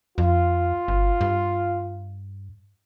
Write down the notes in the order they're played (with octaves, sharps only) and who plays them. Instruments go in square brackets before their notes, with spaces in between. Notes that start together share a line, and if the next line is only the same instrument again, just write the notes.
[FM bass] F2 [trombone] F4
[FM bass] G1
G2